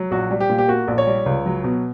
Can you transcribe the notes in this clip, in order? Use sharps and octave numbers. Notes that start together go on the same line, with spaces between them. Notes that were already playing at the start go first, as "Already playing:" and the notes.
Already playing: F#3
A#1 F#4
G3
G4
A#2
G4
A#3 F#4
A#1
C#5
G3
C#2
F#3
B2